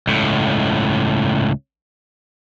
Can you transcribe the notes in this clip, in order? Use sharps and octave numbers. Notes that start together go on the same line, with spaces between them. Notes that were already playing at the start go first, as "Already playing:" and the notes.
C#2 A2